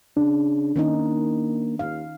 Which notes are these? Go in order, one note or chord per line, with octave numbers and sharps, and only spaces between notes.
C#3 D4
D#3 A#3 C#4 D#4
D#2 F5